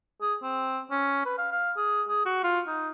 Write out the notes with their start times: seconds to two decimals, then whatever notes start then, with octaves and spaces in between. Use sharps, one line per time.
0.21 G#4
0.43 C4
0.91 C#4
1.26 B4
1.38 F5
1.52 F5
1.77 G#4
2.08 G#4
2.25 F#4
2.44 F4
2.67 D#4